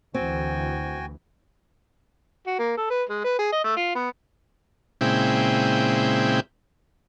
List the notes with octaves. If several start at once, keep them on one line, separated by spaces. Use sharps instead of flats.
D2 E3 C4 F#4 G5 G#5
F#4
A#3
A4
B4
G#3
B4
G#4
D#5
A3
F4
B3
A#2 C#3 G#3 C4 E4 G5